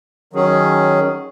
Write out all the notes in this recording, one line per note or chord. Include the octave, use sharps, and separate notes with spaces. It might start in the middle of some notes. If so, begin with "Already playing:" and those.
D#3 F#3 C#4 G#4